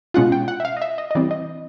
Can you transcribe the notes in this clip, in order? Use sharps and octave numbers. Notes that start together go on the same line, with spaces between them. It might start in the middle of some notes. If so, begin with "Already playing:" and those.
B2 G#3 C#4 F4 F#5
G5
F#5
E5
F5
D#5
E5
D#5
D#5
E3 G3 C4 D5
D#5